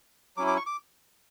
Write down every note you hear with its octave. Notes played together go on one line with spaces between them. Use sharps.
F#3 C#4 E4 D6
D6
C#6
D6